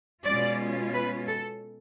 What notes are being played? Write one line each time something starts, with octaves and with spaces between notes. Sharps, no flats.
B2 G#3 C#4 F4 D5
B4
A4